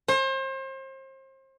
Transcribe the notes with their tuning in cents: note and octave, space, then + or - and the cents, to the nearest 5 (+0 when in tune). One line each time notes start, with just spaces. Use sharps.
C5 +35